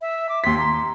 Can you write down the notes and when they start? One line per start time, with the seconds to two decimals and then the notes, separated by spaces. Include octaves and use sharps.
0.01 E5
0.29 D6
0.44 D#2 C6 B6
0.58 A#5 C6